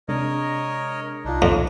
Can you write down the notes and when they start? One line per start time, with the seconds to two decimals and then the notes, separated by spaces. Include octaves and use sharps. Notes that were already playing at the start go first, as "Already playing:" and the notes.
0.09 C3 G#3 D4 A#4 C#5 D#5
1.25 C2 D4 D#4 F4
1.42 F2